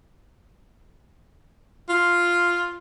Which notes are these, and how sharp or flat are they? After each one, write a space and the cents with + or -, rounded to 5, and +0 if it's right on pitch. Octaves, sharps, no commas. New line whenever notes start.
F4 +0